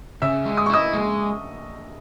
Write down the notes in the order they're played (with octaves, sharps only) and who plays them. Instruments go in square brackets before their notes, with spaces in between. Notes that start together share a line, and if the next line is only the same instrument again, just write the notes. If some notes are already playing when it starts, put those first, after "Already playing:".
[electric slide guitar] C#3 [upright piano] E5 E6
[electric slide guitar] G#3
[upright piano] D#6
C#6
[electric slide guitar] E4 [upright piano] D#5 D#6
[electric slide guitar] G#3